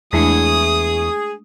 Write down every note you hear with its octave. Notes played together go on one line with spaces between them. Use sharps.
E2 G#3 A3 D4 E4 G#4 C#6 D#6